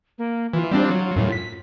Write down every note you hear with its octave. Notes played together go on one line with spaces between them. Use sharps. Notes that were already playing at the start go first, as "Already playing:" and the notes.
A#3
E3 F4
G3 C4 D4
F#3
F#2 A2
B6